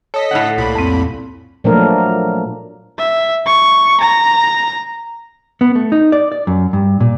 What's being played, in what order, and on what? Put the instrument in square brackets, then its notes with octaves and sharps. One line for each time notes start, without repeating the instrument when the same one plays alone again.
[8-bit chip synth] A4 D#5 B6 [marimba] C#5
[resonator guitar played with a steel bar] A2 C#4 F#5
[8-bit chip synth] C2 A#2 B5
[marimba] F2 C4
[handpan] A#2 F3 F#3 A3 D4 A#4
[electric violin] E5
C#6
A#5
[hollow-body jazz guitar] B3
A3
D#4
D5
D5
F#2
G2
A#2